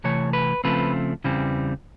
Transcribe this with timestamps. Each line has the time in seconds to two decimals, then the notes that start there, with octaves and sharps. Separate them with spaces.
0.04 C3 E3 A3 C#5
0.33 B4
0.64 C#3 F3 A3 C4 B4
1.24 E2 C#3 E3 G3 C4